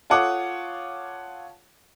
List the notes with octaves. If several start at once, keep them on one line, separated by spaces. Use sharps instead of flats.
F4 A4 C#5 F#5 D6 D#6